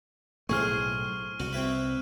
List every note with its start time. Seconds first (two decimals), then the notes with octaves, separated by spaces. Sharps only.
0.49 B1 A2 A3 G#4 C5 C#6 F6
1.40 C2 F#4
1.53 C4 E4 B4